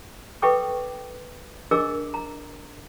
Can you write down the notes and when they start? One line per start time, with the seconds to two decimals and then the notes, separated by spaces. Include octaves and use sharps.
0.42 A4 B4 E5 G5 C#6 D6
1.71 D4 G#4 A#4 D#5 D6 E6
2.14 A#5